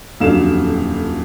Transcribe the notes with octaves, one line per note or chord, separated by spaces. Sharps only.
D#1 F2 D3 F#3 F5 E7